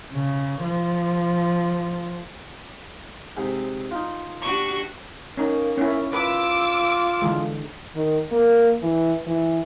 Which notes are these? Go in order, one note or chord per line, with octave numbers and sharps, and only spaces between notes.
C#3
F3
G#2 C3
D#4 F4
D4 F#4 G4 C#6
A#3 C#4 D#4
C#4 E4
F4 B4 D6 E6
D3 E3 G#3
D#3
A#3
E3
E3